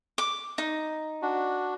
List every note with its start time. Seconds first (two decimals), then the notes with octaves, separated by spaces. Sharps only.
0.18 D6
0.58 D#4
1.22 D4 F#4